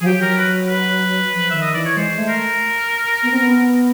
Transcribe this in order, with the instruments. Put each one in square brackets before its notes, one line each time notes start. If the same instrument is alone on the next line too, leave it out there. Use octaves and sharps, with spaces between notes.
[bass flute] F3 [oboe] G#4
[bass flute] F#3 [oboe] G4
[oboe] A#4
B4
B4
[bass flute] F3
[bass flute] D#3 [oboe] E5
[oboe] D#5
[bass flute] E3 [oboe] D5
[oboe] C#5
[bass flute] G#3 [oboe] C5
[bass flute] A3
[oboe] A#4
[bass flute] B3
C4
B3